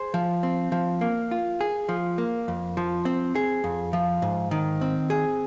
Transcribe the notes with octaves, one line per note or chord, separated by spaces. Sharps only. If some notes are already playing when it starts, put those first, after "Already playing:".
Already playing: G#4 C5
F3
C4
F3
A#3
F4
G#4
F3
A#3
F2
F3
C4
G#4
F2
F3
G#2
D#3
C4
G#4